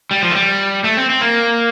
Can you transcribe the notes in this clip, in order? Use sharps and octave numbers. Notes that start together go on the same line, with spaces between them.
G3
F3
A3
G3
A3
C4
C4
A#3